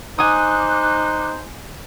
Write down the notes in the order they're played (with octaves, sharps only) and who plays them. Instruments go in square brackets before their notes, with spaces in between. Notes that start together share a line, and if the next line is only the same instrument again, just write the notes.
[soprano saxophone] D#4 [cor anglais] C5 [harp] G#5 D#6 [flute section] D6 F#6